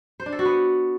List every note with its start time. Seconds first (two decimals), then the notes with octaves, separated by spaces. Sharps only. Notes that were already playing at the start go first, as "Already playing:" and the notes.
0.20 C5
0.26 D4
0.32 A4
0.39 F#4
0.45 B3